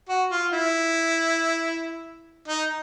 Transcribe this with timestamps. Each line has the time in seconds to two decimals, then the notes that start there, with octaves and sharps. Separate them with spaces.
0.09 F#4
0.31 F4
0.53 E4
2.48 D#4